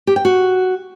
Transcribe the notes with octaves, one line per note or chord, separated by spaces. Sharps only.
G4
G5
F#4